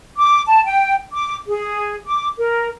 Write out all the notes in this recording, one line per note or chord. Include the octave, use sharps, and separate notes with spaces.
D6
A5
G5
D6
G#4
D6
A#4